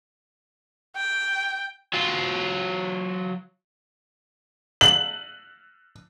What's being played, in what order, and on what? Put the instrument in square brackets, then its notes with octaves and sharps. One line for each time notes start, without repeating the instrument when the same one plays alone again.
[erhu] G5
[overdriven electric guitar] F#3 F4
[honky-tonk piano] F#7